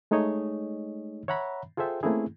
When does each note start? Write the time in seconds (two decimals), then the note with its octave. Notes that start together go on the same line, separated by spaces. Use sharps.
0.11 G#3 A3 D#4 G#4 C#5 D#5
1.28 C#5 E5 F#5 A#5 B5
1.77 F4 G#4 A4 C5 E5 G5
2.03 A3 A#3 C4 C#4 E4 G#4